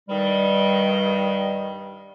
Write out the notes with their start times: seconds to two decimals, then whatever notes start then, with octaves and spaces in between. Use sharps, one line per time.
0.09 G2 D#3 G3